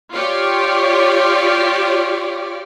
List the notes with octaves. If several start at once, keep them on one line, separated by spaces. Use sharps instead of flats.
F4 G4 C#5 D5